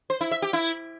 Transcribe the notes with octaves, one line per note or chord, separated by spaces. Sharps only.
C5
E4
E5
G4
E4